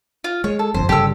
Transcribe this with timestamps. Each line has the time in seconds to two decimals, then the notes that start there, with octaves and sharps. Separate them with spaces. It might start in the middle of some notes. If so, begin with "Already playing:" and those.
0.24 F4
0.44 G#3 C#5
0.59 A4
0.74 G1 F2 C5
0.89 G1 C#3 G3 G4 A4 E6